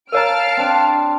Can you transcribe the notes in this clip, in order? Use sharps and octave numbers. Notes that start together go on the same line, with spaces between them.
A#4 C#5 F5 A5 A#5 F6 D7
C4 D4